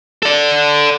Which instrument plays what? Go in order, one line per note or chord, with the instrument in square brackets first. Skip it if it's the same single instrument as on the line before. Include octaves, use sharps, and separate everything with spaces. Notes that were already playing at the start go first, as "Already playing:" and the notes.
[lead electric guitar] A4 D5